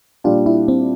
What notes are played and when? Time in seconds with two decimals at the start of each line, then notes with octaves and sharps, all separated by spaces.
0.24 A#2 G3 D4 F4
0.46 E4
0.68 C4